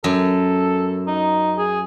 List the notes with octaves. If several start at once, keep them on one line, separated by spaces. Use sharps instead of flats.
F#2 A4
D#4
G#4